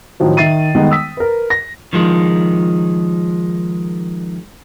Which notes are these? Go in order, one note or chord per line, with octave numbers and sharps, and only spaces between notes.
A2 D#3 F3 F#3
D#3 E5 A6 C7 D#7
D#3 G3 G#3 B3 D#4
D#6 E6 B6
A#4 B4
A#6
D#3 F3 G#3